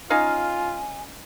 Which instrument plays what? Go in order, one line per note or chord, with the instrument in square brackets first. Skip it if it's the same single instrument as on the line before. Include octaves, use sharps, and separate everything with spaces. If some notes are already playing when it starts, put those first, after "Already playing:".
[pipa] C#4 D#4 F5 [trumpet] F4 [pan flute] G#5